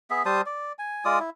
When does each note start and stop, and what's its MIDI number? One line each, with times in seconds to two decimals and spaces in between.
0.10 0.23 59
0.10 0.23 68
0.10 0.23 76
0.25 0.41 55
0.25 0.41 72
0.25 0.41 81
0.25 0.41 87
0.46 0.72 74
0.79 1.04 80
1.05 1.19 56
1.05 1.19 65
1.05 1.19 74
1.05 1.19 87
1.20 1.30 64